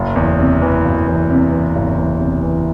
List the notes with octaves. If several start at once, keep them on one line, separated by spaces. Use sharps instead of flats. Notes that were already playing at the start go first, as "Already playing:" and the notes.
Already playing: F#1
E2
C3
E3
F#1
E2
C3
E3
F#1
E2
C3
E3